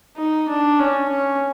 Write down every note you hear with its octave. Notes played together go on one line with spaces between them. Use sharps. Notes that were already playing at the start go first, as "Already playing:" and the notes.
D#4
D4
C#4
C#4